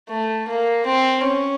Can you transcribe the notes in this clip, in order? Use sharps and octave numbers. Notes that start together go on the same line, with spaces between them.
A3
A#3
C4
C#4